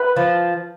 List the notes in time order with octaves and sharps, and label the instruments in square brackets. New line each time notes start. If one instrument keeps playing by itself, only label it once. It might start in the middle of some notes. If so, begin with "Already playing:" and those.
Already playing: [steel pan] B4
[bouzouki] F3